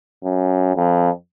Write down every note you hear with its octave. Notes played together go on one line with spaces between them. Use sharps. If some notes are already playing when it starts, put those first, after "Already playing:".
F#2
F2